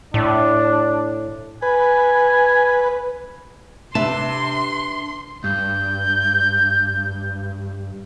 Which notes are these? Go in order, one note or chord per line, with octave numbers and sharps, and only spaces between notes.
A2 D4
B4 G#5
C3 D4 B4 E5 A5 C6
G2 G6